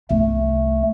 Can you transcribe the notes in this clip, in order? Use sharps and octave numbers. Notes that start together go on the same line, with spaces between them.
C2 A3